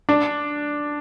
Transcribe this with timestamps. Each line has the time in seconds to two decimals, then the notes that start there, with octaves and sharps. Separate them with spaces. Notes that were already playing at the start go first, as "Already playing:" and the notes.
0.09 D4